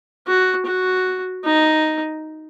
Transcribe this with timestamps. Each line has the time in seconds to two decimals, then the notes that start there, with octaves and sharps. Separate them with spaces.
0.27 F#4
0.66 F#4
1.45 D#4